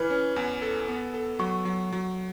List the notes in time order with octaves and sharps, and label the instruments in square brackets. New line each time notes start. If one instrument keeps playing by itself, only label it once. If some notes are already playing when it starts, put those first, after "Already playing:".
Already playing: [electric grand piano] E3 [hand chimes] B4
[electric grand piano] C#4
E2
A4
B3
A4
[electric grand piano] F#3 [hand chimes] C#6
[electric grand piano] F#3
F#3